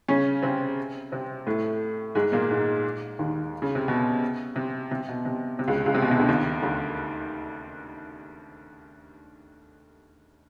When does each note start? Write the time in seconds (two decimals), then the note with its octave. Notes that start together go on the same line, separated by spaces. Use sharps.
0.08 C#3 C#4
0.43 C3 C4
1.12 C3 C4
1.47 A2 A3
2.15 G#2 G#3
2.32 A#2 A#3
2.50 G#2 G#3
3.19 D#2 D#3
3.62 C#3
3.75 C3
3.88 B2
4.56 C3
4.91 C3
5.09 B2
5.25 C3
5.59 C3
5.68 C#2 C#3
5.86 C#2 C#3
5.94 C3
6.02 B2
6.11 C3
6.19 D2 D3
6.28 D#2 D#3
6.63 D2 D3